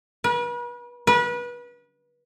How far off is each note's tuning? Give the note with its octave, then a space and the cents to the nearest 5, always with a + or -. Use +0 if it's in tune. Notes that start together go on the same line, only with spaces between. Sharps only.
B4 -40
B4 -30